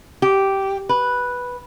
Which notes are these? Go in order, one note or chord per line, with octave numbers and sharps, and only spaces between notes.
G4
B4